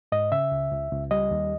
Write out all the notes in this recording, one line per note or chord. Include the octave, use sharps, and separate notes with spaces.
G#2 D#5
C#3 E5
C#2
C#2
C#2
G3 D#5
D#2